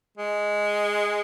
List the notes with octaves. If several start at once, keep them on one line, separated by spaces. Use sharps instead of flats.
G#3